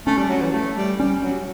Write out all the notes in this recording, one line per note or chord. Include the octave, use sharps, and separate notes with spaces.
A3 C#4
G3
F#3
E3
A3
G3
G3 C#4
F#3